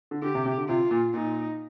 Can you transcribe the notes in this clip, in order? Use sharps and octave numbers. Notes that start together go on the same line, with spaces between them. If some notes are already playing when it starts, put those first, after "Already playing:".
D3
D3 G4
C3
C3
D3
C3 F4
A#2
A#2 D#4